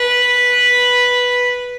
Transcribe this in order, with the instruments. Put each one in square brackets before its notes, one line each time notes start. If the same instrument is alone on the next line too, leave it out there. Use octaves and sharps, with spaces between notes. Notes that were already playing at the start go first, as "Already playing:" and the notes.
Already playing: [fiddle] B4